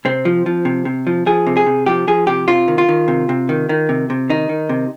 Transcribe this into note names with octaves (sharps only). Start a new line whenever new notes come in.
C3 C4
F3
F3
C3
C3
F3
F3 G#4
C3
G#4
C3
F3 G4
F3 G#4
C3 G4
C3 F4
D#3
F4
D#3
C3
C3
D#3
D#3
C3
C3
D#3 D#4
D#3
C3